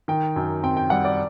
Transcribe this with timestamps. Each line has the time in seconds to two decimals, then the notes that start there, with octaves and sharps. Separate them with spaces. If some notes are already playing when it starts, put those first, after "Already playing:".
0.08 D#3 G5
0.36 F#2
0.63 C4 G5
0.77 G5
0.90 G3 F#5
1.05 D5